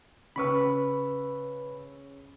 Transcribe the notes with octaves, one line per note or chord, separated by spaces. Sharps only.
C#3 B4 B5 C#6 E6